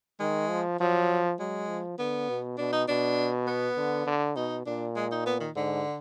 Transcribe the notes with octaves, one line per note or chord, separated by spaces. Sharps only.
D#3 G#3
F3
F3 F#3
F#3 G#3
F3
D3 B3
B2
B2 D4
D#4
B2 D4
B3
D3
D3
B2 D#4
A#2 D4
G#3
D#4
B3
D#3
G#2 D3